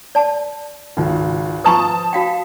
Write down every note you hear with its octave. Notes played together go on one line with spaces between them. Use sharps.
D5 A5
G#1 C#2
F3 B4 A5 A#5 C#6 D#6
F#4 F5 G5